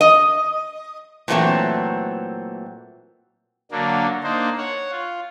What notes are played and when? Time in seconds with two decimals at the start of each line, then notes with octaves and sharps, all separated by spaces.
0.01 D#5
1.28 A#2 E3 F#3 G3 A3 C4
3.71 D3 F#3 A#3 D4
4.23 A#3 D4 D#4 C5
4.57 C#5 F#5
4.91 F4